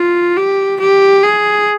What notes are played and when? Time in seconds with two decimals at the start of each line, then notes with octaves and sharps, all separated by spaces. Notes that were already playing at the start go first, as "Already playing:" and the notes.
Already playing: F4
0.36 G4
0.80 G4
1.23 G#4